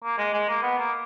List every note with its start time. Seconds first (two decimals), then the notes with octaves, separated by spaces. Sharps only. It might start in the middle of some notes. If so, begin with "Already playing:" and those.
0.04 A#3
0.18 G#3
0.33 G#3
0.49 A#3
0.62 B3
0.78 A#3